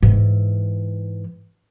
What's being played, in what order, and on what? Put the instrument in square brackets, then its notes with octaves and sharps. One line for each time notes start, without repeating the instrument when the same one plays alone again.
[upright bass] G#2 E3